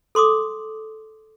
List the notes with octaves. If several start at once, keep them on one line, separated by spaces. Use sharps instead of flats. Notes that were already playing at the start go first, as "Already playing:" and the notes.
A4 C6 D6 D#6